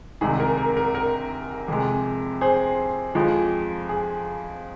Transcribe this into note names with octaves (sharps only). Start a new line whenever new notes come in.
C2 C3 D#3 G#3 G#4
A#4
A#4
A#4
A#4
F2 C3 G#3
G#4 C5
F2 F3 G#3
G#4